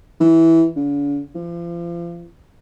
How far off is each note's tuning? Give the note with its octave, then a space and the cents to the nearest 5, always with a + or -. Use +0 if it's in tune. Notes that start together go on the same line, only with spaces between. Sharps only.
E3 -10
D3 -45
F3 -35